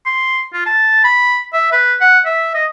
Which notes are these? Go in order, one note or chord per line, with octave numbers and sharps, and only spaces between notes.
C6
F4
A5
B5
E5
B4
F#5
E5
D#5